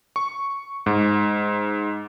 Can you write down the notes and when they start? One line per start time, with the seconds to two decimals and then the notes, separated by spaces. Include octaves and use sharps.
0.16 C#6
0.86 G#2